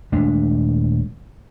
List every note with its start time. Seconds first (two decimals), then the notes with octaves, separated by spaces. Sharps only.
0.12 D#1 G#3 A3 D4